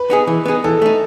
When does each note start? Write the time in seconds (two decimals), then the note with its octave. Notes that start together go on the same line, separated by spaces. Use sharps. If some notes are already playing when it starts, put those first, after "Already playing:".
Already playing: B4
0.10 B3 D#4 G#4
0.27 E3
0.45 B3 D#4 G#4
0.64 E3 A4
0.82 A3 D#4